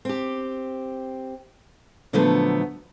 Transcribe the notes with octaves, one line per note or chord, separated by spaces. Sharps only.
C4 G4
A#2 D3 F3 F#3 A3 B3